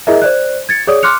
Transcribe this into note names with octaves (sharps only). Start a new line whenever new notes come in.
E4 G#4 A#4 D#5 E5
C5 D5 F#6
G#6 A6 C#7
G#4 C#5 D5 D#6
C6 D6 F6 F#6 C#7 F7